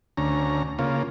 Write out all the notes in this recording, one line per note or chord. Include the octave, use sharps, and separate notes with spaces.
D2 C#4 A#5
C#3 A#3 F4